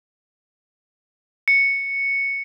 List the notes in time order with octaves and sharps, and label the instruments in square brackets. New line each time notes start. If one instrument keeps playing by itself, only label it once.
[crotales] C#7